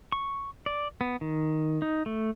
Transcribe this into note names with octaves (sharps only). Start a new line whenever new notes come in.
C#6
D5
B3
D#3
D#4
A3